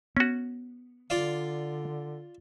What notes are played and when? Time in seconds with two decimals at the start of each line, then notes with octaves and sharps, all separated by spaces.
0.17 B3 C#4 F#4
1.10 D3 F4 D5 F5